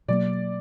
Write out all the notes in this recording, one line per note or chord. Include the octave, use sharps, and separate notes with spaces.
B2 F#3 A#3 D5